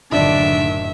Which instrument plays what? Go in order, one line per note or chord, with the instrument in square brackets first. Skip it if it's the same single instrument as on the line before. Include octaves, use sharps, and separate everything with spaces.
[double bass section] F#1 A2 D#3 [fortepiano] D3 D5 [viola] D4 [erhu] E5